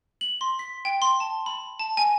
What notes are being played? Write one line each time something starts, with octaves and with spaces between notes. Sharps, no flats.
F#7
C6
B6
G5
C6
A5
B5
A5
G#5